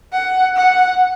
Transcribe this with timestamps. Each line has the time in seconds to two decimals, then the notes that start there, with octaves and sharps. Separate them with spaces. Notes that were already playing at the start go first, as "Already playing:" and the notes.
0.13 F#5
0.56 F#5